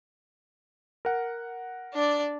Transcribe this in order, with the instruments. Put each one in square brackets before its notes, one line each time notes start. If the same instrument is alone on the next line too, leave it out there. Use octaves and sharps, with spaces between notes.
[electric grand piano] A#4 F#5
[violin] D4 D5